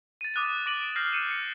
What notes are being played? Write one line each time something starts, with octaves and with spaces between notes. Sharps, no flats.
A6 D#7
D6 D#6 F#6 A6 D#7
D6 A#6 D7 D#7 F#7
F6 G6 A#6 C7
F6 C7 C#7 D#7 E7
F6 C#7